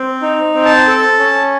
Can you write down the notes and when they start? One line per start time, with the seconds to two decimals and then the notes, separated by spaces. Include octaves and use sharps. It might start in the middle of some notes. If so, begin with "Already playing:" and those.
Already playing: C4
0.22 D#4
0.54 C4
0.65 A5
0.88 A4
1.19 C#4